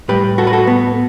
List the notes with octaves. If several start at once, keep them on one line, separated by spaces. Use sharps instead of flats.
A2 G3 G4 B4
F#4 A4
B4
F#4 A4
B3